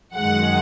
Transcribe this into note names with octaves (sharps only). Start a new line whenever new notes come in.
F#2 D#3 G#3 F#5